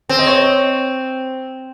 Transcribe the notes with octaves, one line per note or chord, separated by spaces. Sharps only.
C4
D#5
C#5